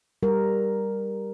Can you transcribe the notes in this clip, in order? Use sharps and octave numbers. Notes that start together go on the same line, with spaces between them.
G3 A#4